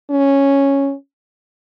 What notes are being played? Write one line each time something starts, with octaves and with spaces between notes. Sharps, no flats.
C#4